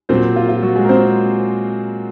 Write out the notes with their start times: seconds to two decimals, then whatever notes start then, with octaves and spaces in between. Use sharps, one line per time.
0.09 A#2 F#3 C4 C5
0.36 F4
0.49 F4
0.63 F#3 F#4
0.76 G#3 G#4
0.84 A#4
0.89 C4 C5